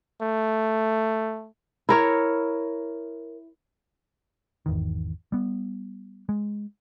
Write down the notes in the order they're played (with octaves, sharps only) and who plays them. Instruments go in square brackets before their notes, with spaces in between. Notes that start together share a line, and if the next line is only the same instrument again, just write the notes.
[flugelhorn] A3
[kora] E4 A#4 C#5
[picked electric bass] G#1 E2 D#3
G3 B3
G#3